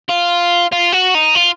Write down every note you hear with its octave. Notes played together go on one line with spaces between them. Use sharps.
F4
F4
F#4
D#4
F4